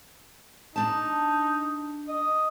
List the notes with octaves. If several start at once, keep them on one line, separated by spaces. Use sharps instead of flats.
D4 D#4 A5
D#5